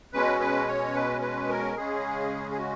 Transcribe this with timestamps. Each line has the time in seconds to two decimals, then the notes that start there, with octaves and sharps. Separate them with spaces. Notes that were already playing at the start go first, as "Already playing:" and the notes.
0.13 B2 G#3 C#4 B4
0.40 B4
0.68 C#5
0.95 B4
1.22 B4
1.49 A#4
1.76 C#3 G#3 C#4 G#4
2.51 G#4
2.58 F#4